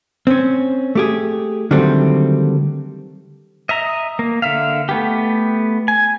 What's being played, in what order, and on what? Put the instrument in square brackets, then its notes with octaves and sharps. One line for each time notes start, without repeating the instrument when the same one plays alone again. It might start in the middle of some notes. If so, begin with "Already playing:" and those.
[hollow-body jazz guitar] C4 C#4
A3 G4 G#4
D3 D#3 F#3 G3 A3 C4
[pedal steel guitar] D#5 E5 A#5
A#3
D3 E5 F5
A3 B3 G4
G#5